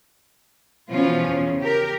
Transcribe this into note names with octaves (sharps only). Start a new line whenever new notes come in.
B2 E3 F3 C#4 F4
E2 C#3
G4 A#4